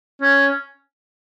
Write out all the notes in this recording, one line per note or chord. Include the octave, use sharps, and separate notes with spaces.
C#4